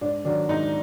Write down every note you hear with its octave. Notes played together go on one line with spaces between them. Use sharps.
G#2 D4
D#3 F#3 D4
G#2 D#4